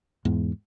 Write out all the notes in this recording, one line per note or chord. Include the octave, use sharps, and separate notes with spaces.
E2 G#2